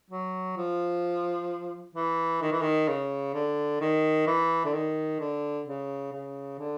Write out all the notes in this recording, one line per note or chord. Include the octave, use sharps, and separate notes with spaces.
F#3
F3
E3
D#3
E3
D#3
C#3
D3
D#3
E3
D3
D#3
D3
C#3
C#3
D3